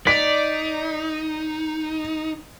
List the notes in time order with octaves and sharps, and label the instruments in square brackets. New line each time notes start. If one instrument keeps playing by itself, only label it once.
[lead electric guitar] D#4 [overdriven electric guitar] D5 [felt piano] B6